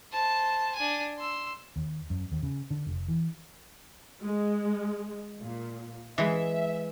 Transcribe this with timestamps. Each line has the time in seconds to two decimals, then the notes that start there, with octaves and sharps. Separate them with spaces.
0.12 C5 A5
0.75 D4 G#5
1.19 C6 E6
1.76 D#2
2.10 F#2
2.32 D#2
2.43 C#3
2.70 D3
2.87 F1
3.08 E3
4.22 G#3
5.40 A#2
6.18 E3 G#3 E5